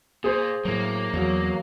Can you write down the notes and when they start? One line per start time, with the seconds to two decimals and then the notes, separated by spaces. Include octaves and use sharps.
0.24 A#2 G#4 C5
0.65 A2 F#3 A#3
1.13 E2 F#3